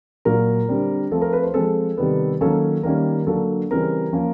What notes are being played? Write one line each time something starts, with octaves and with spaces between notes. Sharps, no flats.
A#2 F#3 A#3 A#4
D3 G3 C4
F3 A3 C4 A4
A#4
B4
C5
F3 G#3 C4 A4
C3 D#3 G3 B3
D#3 F#3 A#3 C#4 A4
D#3 G3 A#3 C#4 A#4
D3 F#3 A#3 D4 A4
C#3 E3 G3 C4 A#4
F3 A#3 C#4